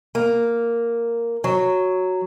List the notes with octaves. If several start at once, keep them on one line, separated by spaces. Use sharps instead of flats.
A#3
F#3